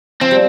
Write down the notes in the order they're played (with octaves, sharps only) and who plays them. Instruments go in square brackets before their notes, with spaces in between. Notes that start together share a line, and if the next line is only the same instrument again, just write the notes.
[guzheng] F3 [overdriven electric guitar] C4
[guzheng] G3